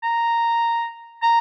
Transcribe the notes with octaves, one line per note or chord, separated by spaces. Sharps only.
A#5
A#5